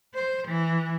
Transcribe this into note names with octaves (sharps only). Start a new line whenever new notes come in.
C5
E3